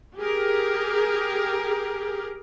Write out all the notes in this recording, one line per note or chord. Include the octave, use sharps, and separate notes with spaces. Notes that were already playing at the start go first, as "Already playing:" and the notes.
G4 G#4 A#4